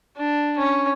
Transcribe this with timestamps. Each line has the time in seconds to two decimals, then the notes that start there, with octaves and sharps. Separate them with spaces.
0.17 D4
0.58 C#4